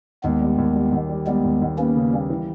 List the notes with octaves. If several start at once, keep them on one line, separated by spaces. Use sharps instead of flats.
D#2 G#3 B3
G3
D#2
G3
D#2
G3
G3 G#3 B3
D#2
D#2
A#3 B3 C#4
C#3
G3
E3